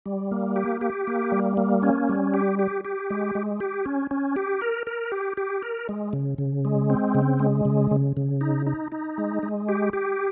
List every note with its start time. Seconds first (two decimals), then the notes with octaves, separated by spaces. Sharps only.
0.06 G3
0.31 A#3
0.56 G4
0.81 G4
1.07 A#3
1.32 G3
1.57 A#3
1.83 C#4
2.09 G3
2.34 G4
2.59 G4
2.85 G4
3.10 G#3
3.35 G#3
3.60 G4
3.86 C#4
4.11 C#4
4.36 G4
4.62 A#4
4.87 A#4
5.12 G4
5.37 G4
5.63 A#4
5.89 G#3
6.13 C#3
6.38 C#3
6.65 G#3
6.90 C4
7.15 C#3
7.40 G#3
7.65 C#3
7.91 C#3
8.17 C#3
8.41 D#4
8.67 D#4
8.92 D#4
9.18 G#3
9.43 G#3
9.69 G4
9.93 G4